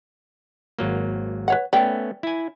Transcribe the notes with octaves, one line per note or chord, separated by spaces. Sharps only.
G#1 F#3 A#3
B4 C#5 F#5
A3 B3 C#4 D5 G5
E4 G#5